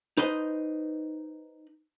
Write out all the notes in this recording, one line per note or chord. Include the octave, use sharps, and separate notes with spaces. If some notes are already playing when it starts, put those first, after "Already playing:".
D#4 B4 C5 D#5